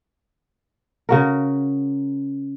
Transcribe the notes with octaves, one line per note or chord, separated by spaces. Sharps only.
C#3 F#4 A#4